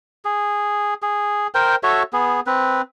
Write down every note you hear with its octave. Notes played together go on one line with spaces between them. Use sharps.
G#4
G#4
A#4 C5 G5
F#4 A4 C#5 E5
B3 G#4
C4 B4